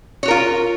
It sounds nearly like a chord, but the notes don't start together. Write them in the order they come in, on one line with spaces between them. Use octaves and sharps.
C#5 F#4 A#4 F4